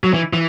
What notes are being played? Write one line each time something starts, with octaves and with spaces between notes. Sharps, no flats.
F#3
E3
E3